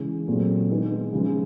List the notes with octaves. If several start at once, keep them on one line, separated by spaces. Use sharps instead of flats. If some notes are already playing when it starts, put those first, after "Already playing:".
Already playing: C#3 E3 G#3 C#4
A#2 F#3 A3 C4
D#3 G#3 B3 D#4
C#3 F3 G#3 C#4